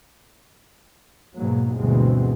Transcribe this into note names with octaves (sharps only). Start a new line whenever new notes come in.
G#2 B2 F#3 A#3
D2 G2 B2 E3 G#3 C4